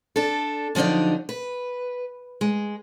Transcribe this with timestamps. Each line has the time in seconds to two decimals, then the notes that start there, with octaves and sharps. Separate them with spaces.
0.16 D4 A4
0.75 D3 F3 F#3 D4 D#4
1.29 B4
2.41 G#3